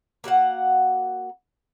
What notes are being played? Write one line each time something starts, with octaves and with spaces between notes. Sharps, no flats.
A#3 F#4 F5 F#5